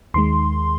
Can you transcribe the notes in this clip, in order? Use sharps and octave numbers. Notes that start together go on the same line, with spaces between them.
D#2 D#3 G#3 C6